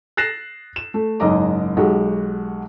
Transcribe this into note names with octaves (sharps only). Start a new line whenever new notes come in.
F#6 A6 A#6 C7 E7
E7
A3
F#1 G#2 D#5 A#5 D6
B1 G#3 F#4 G4